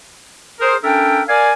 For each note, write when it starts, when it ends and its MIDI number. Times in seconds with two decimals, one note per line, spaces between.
0.60 0.75 68
0.60 0.75 70
0.60 0.75 72
0.84 1.22 61
0.84 1.22 62
0.84 1.22 69
0.84 1.22 70
0.84 1.22 76
0.84 1.22 79
1.28 1.52 70
1.28 1.52 74
1.28 1.52 77
1.28 1.52 80